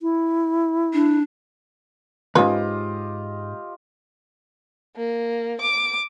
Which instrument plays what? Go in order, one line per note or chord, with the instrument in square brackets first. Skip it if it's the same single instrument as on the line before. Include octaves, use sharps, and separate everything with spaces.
[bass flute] E4
[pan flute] D4
[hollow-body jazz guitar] D2 G#2 [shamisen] C#4 B4 [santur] F4 G4 D#5
[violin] A#3
D6